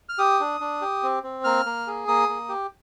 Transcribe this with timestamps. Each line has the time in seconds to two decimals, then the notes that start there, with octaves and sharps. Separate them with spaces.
0.09 F6
0.18 G4 D#6
0.40 D4
0.61 D4
0.81 G4
1.03 C4
1.23 C4
1.44 A#3 F6
1.66 A#3
1.87 G#4
2.08 A#3 D#6
2.29 A#3
2.49 G4